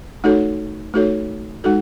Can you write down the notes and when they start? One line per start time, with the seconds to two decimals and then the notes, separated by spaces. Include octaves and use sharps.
0.24 A3 D#4 F#4 A4 C#5
0.94 A3 D#4 F#4 A4 C#5
1.64 G#3 D#4 F#4 A4